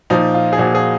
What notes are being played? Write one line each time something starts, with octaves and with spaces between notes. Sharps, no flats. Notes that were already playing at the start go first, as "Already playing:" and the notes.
A#2 F3 D#4
F4
G#4
A#2 F3 F#4
G#4